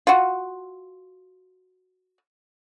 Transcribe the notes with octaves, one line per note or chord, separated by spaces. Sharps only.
F4 F#4